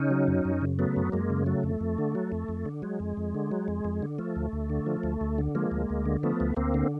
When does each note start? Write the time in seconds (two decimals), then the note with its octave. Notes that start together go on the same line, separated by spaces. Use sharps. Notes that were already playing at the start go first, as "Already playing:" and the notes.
Already playing: C#3 C#4 D#4
0.10 F#3
0.28 F#2
0.45 F#2
0.61 C#3
0.79 F#3 A3 B3
0.96 F#2
1.12 F#2 G#3 A#3
1.30 C#3
1.46 F#3 A3
1.64 F2
1.81 F2
1.98 D3
2.15 F#3
2.32 F2
2.49 F2
2.66 D3
2.82 F#3 G#3
3.00 F2
3.17 F2
3.34 D3
3.51 F#3
3.68 F2
3.85 F2
4.02 D3
4.18 F3 A3
4.36 D2
4.53 D2
4.70 D3
4.86 F3
5.03 D2
5.21 D2
5.38 D3
5.55 F3 G#3 A#3
5.72 D2
5.90 D2
6.06 D3
6.23 F3 A3 B3
6.40 D2
6.57 D2 A#3 C4
6.74 D3